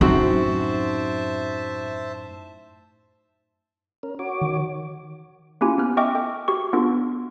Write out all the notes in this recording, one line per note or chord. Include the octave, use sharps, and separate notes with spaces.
F#2 A2 C4 D#4 F#4 C5 E5 A5
C#4 A#4
F#4 C#5 D6
D#3
A#3 C#4 E4 F4 G4 G#5
B3 G#5 F6 F#6
D#5 E5 G5 C#6 D6 F6
A4 G5
F#4 G4 C#6
B3 D4 F4 A4